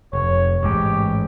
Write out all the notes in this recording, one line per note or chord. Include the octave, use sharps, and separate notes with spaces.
F1 C#5
A1 G#2 G#3 G4